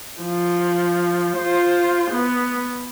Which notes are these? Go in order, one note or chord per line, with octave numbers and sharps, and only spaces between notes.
F3
F4 C5
B3